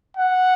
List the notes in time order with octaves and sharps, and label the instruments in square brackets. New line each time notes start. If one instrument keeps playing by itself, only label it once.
[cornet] F#5